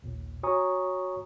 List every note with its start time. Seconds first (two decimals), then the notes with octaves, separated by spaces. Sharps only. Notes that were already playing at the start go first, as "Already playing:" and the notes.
0.02 A#1 D#2 A#2
0.43 F#4 C#5 G#5 A#5 C#6 D#6